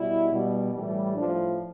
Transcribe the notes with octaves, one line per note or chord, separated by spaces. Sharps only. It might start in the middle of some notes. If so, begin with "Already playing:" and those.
Already playing: B2 G3 E4
B2 G3
A2 E3 G3
A2 F3 D4